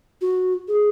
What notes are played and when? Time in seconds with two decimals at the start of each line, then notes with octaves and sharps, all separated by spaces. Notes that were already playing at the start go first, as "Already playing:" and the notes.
0.21 F#4
0.68 G#4